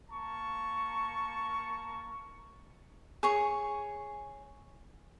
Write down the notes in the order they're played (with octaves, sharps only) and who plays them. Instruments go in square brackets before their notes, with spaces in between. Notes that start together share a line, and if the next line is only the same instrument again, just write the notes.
[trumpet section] A#3 A5 A#5 C#6
[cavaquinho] G#4 C#5 C#6